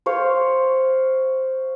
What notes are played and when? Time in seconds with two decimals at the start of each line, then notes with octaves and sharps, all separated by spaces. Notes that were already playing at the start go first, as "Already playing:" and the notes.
0.06 C5 C#5 F5